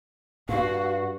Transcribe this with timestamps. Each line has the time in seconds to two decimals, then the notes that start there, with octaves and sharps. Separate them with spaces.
0.49 G2 F#4 F5